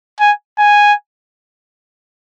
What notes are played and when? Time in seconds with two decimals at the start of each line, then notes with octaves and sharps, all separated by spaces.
0.20 G#5
0.58 G#5